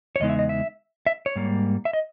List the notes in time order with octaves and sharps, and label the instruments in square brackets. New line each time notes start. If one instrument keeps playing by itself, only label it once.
[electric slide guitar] C#5
E2 C#3 G#3 B3 D#4 D#5
E5
D#5
E5
E5
C#5
G#2 G3 A#3
E5
D#5